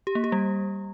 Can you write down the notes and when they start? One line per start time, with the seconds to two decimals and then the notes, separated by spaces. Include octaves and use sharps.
0.07 G4
0.15 A#3
0.24 G4
0.32 G3